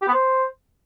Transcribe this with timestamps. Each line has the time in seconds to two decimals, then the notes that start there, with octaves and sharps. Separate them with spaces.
0.02 G4
0.08 B3
0.13 C5